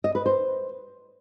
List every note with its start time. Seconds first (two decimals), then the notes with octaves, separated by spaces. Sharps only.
0.04 D#5
0.15 B4
0.26 C5